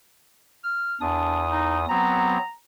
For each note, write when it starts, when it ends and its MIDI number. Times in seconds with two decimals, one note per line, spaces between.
0.64 0.96 89
1.01 1.86 40
1.01 1.41 62
1.01 1.86 87
1.50 1.77 63
1.89 2.38 54
1.89 2.38 59
1.89 2.38 60
1.89 2.54 82